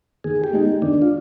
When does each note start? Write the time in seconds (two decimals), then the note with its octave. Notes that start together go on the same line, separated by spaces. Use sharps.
0.24 D#3 G#4
0.44 G4
0.53 G#3 B3 D#4 G#4
0.82 D#3 D4
1.02 F4